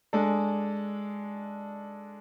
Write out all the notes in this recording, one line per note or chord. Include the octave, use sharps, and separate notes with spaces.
G#3 D4 A4